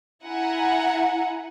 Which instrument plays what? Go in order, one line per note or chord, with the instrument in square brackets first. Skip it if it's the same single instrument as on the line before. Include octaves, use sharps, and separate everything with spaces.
[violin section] E4 F#5 G#5 A#5